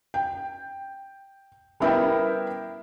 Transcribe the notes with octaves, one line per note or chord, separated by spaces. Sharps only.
G5
G3 B3 E4 A#4 E5 G5